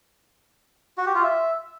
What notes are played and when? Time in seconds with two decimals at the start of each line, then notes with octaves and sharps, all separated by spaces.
0.98 F#4
1.06 G4
1.15 F4
1.23 E5